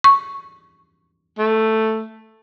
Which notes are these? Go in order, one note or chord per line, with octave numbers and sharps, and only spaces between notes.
C#6
A3